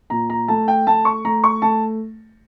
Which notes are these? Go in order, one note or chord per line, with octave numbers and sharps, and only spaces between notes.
A#2 A#5
A#5
A3 A5
G5
A3 A5
C#6
A3 A#5
C#6
A3 A5